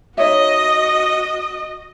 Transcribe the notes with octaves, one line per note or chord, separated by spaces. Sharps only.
D#4 F#4 C#5 D#5 E5